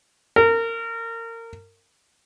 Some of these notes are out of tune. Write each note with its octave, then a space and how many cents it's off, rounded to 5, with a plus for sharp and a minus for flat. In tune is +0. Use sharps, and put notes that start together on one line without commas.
A#4 -25